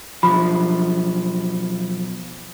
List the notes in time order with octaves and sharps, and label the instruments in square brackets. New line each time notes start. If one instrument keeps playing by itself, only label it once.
[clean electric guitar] B1 F3 [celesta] B5